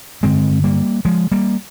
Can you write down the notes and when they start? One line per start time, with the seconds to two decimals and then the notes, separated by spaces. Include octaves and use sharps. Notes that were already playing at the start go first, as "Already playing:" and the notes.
0.23 G2 D3 G#3 C4
0.64 G3 A#3
1.05 F3 G#3
1.32 G3 A#3